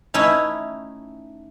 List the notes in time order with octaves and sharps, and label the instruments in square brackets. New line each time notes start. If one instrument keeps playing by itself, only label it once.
[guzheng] A3 C#4 D#4 E4